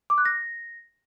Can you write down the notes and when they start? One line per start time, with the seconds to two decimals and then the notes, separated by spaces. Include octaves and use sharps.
0.10 D6
0.18 F#6
0.26 A#6